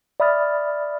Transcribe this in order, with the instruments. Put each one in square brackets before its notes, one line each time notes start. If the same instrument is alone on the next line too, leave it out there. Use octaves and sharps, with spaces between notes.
[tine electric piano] D5 E5 B5 D#6 F6 A6